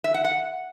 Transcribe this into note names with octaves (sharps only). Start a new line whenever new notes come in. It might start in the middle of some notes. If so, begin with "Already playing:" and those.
E5
F#5
F#5